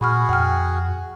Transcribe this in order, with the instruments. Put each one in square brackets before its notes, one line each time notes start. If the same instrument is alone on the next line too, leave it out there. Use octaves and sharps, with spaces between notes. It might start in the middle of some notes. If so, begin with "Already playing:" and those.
[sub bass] A#2 [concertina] F#4 G#4 [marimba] B5 C#6 F6
[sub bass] F2 [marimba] F#5 G5 F6